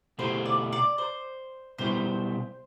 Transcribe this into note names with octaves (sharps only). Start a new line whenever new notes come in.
B2 A3 E4 G4 C5
D5
D5
C5
B2 G3 B3 E4 G4 C5